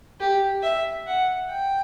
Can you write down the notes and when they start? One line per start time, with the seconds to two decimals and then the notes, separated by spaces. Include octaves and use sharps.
0.20 G4
0.63 E5
1.07 F#5
1.50 G5